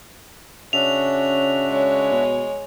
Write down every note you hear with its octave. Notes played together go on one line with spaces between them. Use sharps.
C#3 C#4 D4 F#4 E5 F7
G#3 C#5
B2